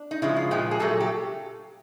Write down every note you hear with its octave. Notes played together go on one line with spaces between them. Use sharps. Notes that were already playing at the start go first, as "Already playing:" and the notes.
Already playing: D4
D#4
C#3 F3 G#3 E4
F4
A#2 F3 G#3 G4
G#4
A#2 F#3 A3 A4
G4